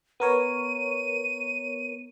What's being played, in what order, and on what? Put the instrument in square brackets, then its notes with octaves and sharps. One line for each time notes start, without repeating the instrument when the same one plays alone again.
[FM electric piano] B3 A#4 C#5 [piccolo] D#7